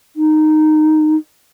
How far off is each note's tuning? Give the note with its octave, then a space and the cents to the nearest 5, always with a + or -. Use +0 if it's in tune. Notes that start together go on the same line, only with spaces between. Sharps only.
D#4 -10